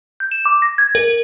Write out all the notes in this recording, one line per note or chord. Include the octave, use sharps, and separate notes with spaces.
G6
E7
D6
A#6
G#6
A#4